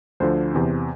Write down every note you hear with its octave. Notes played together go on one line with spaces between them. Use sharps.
D2 D3 F3 C5
E2 C3 E3